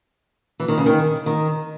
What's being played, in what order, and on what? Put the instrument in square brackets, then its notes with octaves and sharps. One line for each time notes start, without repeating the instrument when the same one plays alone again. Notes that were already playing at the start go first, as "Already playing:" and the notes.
[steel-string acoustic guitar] E3
D#3
C#3
D#3
D#3